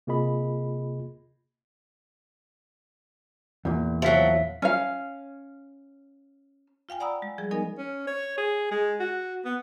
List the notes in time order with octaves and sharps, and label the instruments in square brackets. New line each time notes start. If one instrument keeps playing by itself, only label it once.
[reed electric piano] C3 A#3 F4 G#4 D#5 B5
[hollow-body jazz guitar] E2 A#2
[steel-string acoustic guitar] F3 F#3 [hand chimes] E5 F5 B6
[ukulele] C#4 F5
[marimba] F4 F5 G5 G#5
D5 F#5 A#5 B5 D#6 E6
G#3
F3 G3 G#4
B3 D#4 A#4 D#5 G#5
[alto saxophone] C#4
C#5
G#4
G#3
F#4
B3